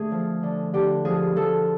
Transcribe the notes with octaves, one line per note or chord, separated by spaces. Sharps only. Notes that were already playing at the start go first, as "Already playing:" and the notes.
Already playing: D3 A3 G#4
F3
D3
D3 G4
F3 G#4
F3 A4